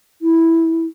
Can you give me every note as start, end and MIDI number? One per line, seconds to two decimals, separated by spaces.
0.22 0.86 64